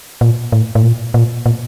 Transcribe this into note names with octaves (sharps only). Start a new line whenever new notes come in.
A#2
A2
A2
A#2
A#2
A#2